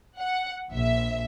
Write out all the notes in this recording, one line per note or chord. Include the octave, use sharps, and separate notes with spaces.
F#5
A#1 E5